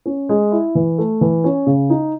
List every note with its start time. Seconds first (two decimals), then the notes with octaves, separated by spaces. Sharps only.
0.06 C#4
0.29 G#3
0.52 E4
0.75 E3
0.98 A3
1.21 E3
1.44 C#4
1.66 C#3
1.90 D#4